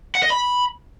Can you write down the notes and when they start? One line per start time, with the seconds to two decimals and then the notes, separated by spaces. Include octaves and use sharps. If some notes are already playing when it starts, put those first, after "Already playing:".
0.15 F#5
0.23 D#5
0.30 B5